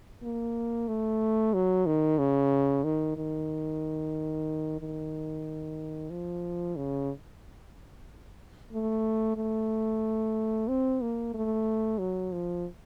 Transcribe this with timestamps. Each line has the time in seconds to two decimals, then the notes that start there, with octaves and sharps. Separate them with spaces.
0.23 A#3
0.88 A3
1.54 F#3
1.86 D#3
2.19 C#3
2.84 D#3
3.17 D#3
4.80 D#3
6.11 F3
6.76 C#3
8.72 A3
9.37 A3
10.68 C4
11.01 A#3
11.34 A3
11.98 F#3
12.32 F3